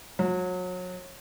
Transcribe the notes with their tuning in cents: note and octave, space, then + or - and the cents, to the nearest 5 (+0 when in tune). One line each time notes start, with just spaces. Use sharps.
F#3 -30